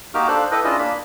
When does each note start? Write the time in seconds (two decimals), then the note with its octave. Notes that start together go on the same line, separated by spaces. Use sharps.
0.14 A#3 D#4 F#4 G4 D6 F6
0.28 D4 A4 C5 F5 F#6
0.51 E4 A4 B4 D#5 G5 D6
0.65 C#4 D4 E4 F4 G#4 D#5
0.79 A#3 D4 B5